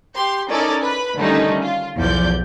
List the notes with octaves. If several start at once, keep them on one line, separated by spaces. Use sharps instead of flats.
G4 C6
C#4 D#4 E4 A4 A#4 D5
B4 B5
D3 D#3 G3 A3 C#4 D#4
F4
B1 E2 F3 D5 G6